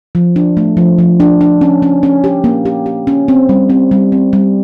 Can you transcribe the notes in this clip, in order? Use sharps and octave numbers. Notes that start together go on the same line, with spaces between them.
F3
D4
A3
F3
F3
D4
D4
C#4
C#4
C#4
G4
A#3
G4
G4
C#4
C4
G3
C4
G3
C4
G3